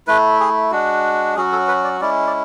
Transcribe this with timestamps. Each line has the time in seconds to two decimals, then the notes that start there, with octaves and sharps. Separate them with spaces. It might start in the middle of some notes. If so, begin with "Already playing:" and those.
0.07 A3 E4 B4
0.40 G#4
0.71 G#3 D4 F#4
1.36 F#3 C#4 F#4 G#4
1.52 A4
1.68 B4
1.84 D5
2.01 G#3 C#4 E4 D5
2.27 D5